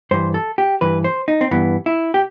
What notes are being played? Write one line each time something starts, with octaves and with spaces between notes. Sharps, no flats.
G2 E3 C5
A4
G4
G2 E3 B4
C5
D#4
C4
G2 E3 B3
E4
G4